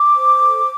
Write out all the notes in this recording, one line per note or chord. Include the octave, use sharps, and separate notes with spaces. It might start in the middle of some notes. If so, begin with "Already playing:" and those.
Already playing: D6
C5
A4